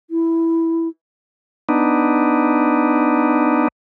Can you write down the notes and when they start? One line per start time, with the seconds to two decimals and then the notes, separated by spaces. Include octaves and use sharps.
0.10 E4
1.69 B3 D4 D#4